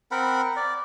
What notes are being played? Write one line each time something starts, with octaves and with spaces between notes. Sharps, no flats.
C4 A#4 F#5 B5
D5